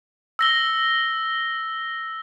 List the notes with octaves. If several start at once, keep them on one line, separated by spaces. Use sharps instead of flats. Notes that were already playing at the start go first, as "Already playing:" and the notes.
E6 A#6 G7